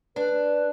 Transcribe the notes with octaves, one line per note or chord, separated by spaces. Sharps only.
D4 B4